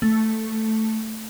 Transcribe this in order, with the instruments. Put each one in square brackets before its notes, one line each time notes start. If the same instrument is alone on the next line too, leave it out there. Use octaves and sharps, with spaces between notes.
[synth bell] A3